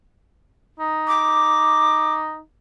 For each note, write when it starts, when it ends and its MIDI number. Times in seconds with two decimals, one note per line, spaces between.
0.80 2.39 63
1.07 2.13 86